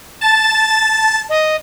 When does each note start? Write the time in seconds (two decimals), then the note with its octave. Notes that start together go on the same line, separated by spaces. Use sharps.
0.21 A5 A6
1.29 D#5